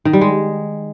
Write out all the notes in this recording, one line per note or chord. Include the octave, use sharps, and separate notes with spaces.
D#3
G3
G#3